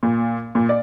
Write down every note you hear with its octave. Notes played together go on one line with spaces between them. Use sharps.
A#2
A#2
D5